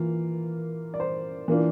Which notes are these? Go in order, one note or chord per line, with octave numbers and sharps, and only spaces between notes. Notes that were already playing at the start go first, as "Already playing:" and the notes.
Already playing: E3 A#3 F4 A#4
D5
C5
E3 A#3 D4 F4